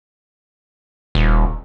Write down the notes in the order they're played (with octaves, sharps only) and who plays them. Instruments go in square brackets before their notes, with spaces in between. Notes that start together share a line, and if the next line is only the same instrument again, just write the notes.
[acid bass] D#1